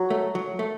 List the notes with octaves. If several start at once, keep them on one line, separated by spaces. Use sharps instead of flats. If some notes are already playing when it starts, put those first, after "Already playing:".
Already playing: F#3
A3
F#3
A3